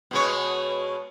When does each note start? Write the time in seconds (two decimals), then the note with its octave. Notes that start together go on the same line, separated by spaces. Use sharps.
0.11 B2 G#3 C#5